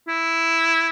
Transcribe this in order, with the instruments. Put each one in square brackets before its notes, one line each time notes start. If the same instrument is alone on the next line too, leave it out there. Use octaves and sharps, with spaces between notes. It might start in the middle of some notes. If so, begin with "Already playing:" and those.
[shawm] E4